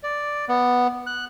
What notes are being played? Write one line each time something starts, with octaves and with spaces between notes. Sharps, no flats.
D5
B3
F#6